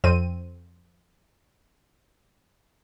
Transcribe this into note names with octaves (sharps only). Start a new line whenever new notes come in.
F2 C4 D#7